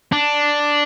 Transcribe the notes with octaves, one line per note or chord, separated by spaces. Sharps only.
D4